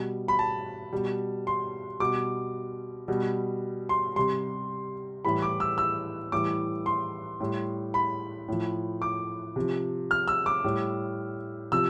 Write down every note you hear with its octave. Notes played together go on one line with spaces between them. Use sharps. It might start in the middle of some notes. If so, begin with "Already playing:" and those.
Already playing: B2 G3
B5
A5
B2 G3
C6
B2 G3 D6
B2 G3
C6
C3 G3 C6
A2 E3 G3 B5
D6
E6
E6
A2 E3 G3 D6
C6
A2 G3
B5
A2 F3
D6
C3 F3
F6
E6
D6
A2 G3
C3 F3 E6